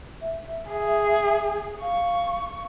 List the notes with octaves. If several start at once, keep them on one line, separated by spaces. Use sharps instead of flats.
E5
G#4
F5 C#6